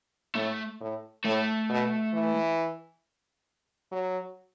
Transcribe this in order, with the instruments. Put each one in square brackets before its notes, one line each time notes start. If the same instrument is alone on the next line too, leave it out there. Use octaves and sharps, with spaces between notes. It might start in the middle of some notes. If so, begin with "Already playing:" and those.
[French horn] A2 [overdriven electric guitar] A3
[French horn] A2
[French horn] A2 [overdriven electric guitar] A3
[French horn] B2
E3
F#3